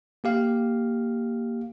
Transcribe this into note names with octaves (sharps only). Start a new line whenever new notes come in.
A#3 G4 F5